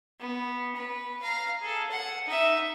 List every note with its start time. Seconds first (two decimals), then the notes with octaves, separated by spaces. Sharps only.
0.20 B3
0.75 B4
1.22 F5 A#5
1.60 G#4 A4
1.91 F#5
2.26 D#4 E5